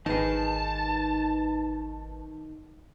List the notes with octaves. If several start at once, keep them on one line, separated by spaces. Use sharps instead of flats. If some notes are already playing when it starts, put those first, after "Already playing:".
G#1 D#3 D#4 G#4 B4 A5